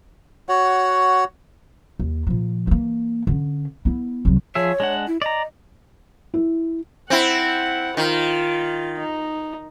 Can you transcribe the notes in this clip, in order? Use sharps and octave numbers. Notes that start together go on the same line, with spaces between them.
F#4 C#5 F#5
D#2
A#2 F3
E3 A#3
D3 C#4
B3 E4
C2 F#3
F3 G#4 C#5 E5
G#3 D4 F#5
E4
D5 D#5 A#5
E4
C4 E4 F#5
D#3 F4
D#4